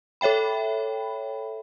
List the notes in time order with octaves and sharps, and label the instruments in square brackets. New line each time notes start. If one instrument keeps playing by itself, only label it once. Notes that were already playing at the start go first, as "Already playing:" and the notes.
[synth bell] A4 C#5 E5 G5 B5